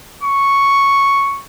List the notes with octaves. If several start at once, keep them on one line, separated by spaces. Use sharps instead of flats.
C#6